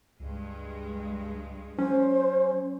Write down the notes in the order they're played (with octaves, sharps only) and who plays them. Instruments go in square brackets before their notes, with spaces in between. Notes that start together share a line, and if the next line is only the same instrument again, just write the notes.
[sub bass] C#2 [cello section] G2 G#3
[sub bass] F#3 [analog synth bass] C#4 [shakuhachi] C5